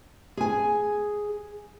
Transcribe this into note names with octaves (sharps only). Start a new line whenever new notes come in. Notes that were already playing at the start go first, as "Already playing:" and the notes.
G#4 G#5